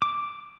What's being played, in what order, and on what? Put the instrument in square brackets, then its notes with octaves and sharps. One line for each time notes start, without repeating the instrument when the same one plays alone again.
[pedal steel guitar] D6